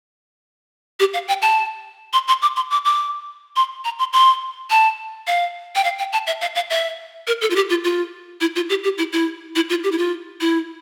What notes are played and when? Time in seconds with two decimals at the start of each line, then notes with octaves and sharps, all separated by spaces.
1.00 G4
1.14 F5
1.28 G5
1.42 A5
2.13 C6
2.28 C6
2.42 D6
2.56 C6
2.71 D6
2.85 D6
3.56 C6
3.85 A#5
3.99 C6
4.13 C6
4.70 A5
5.27 F5
5.75 G5
5.84 F5
5.98 G5
6.13 A5
6.27 E5
6.41 F5
6.55 F5
6.70 E5
7.27 A#4
7.41 A4
7.50 F4
7.56 G4
7.70 F4
7.84 F4
8.41 E4
8.56 F4
8.69 G4
8.84 G4
8.98 E4
9.13 E4
9.55 E4
9.70 F4
9.84 G4
9.92 E4
9.98 F4
10.41 E4